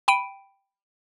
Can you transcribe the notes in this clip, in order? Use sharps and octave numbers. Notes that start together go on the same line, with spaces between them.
G5 B5 D7 D#7